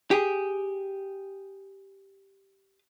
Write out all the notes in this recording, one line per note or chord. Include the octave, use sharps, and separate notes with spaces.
G4 G#4